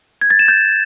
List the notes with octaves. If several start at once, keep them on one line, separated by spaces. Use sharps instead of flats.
G#6
A6
E7
G6